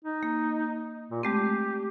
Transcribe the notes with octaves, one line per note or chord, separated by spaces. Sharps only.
D#4
A#3
A#2
G#3 A3 C4 G4